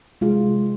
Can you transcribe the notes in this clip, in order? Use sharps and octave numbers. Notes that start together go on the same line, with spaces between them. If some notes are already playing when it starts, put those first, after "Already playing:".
C3 G#3 F4 G#4